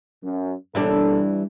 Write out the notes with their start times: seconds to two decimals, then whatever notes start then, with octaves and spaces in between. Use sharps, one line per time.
0.23 F#2
0.75 B2 E3 G3 A#3 D4 A4